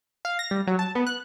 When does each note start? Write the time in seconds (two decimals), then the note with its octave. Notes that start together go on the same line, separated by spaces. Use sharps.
0.25 F5
0.39 A#6
0.51 G3
0.67 F#3
0.79 A5
0.95 B3
1.07 F#6